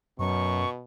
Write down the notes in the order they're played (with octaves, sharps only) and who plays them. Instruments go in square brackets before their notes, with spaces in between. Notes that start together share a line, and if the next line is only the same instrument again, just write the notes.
[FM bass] F#2 [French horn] B2 [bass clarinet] F#3 [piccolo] C#6